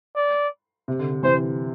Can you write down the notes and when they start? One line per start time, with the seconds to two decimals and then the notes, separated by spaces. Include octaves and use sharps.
0.16 D5
0.88 C3
0.99 D3
1.12 D3
1.23 C3 E3 C5